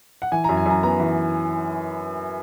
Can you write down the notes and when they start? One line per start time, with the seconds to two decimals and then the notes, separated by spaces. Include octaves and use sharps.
0.22 F#5
0.32 E3 G#5
0.44 F#2 A#5
0.57 G#5
0.66 F#2 A#5
0.83 B3 A#5
1.00 E3